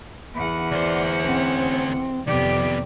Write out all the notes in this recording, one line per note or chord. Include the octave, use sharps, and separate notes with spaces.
E2 F#5 B5
D2 C5 D5
C4 C#4
F2 C3 D#3 B3 G4 D5